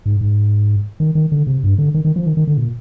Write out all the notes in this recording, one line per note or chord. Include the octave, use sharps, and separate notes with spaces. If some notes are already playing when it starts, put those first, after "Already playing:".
G#2
G#2
D#3
D#3
D3
C3
G2
D3
D#3
D#3
F3
D#3
D#3
D3
A#2